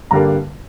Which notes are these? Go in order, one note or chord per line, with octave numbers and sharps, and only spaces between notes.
G2 D3 G3 A#3 A#5